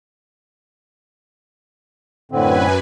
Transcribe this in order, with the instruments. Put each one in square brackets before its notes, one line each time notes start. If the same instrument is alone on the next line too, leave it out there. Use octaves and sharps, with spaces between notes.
[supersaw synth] F#2 B4 G#5 [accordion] A2 D3 C4